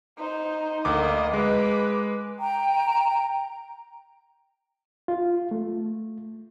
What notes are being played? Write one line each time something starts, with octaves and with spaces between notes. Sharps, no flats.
D#4 C5
D2 A#3 D#5 D6
G#3 B4 D6
G5 A#5
F4
A3